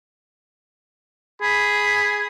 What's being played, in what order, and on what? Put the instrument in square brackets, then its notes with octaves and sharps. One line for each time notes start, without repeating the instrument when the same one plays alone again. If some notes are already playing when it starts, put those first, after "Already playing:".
[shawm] G#4 [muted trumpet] B5